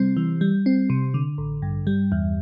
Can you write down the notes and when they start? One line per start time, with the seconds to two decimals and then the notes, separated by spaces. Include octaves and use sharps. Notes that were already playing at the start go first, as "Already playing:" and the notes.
Already playing: C3 G3 C4
0.17 E3
0.41 G3
0.66 C4
0.90 C3
1.14 D3
1.38 A1
1.62 G2
1.87 G3
2.12 E2